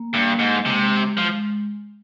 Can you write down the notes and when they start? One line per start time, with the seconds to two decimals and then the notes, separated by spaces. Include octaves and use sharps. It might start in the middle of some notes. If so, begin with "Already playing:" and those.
Already playing: A#3
0.14 G2
0.39 G#2
0.66 C3 G#3
1.17 F3